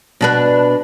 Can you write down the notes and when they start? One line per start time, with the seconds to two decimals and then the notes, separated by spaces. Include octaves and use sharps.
0.21 B2 D4 B4